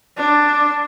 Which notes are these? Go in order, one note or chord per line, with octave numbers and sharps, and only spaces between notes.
D4